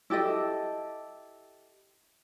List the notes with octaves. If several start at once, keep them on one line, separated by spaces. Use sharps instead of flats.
E4 G4 A4 D#5